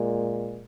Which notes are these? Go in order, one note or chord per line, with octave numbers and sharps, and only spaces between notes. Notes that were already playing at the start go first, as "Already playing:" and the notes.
Already playing: A#2 G#3